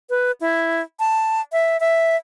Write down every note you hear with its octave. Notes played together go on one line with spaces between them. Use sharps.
B4
E4
A5
E5
E5